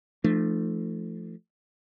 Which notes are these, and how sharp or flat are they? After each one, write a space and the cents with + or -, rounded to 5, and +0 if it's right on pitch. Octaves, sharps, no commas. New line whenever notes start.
F3 -25 A3 +0 D4 +40